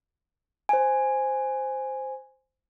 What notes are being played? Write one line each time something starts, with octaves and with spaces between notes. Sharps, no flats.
C5 G#5